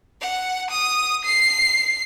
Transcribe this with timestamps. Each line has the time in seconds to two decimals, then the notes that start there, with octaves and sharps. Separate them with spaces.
0.21 F#5
0.71 D#6
1.25 C7